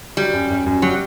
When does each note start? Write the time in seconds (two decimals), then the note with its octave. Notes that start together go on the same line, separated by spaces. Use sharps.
0.17 F#3 G3
0.33 F#2
0.50 F#2
0.66 F#2
0.82 F#3 G3